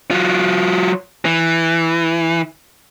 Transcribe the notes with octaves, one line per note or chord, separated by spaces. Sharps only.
F#3 F4
E3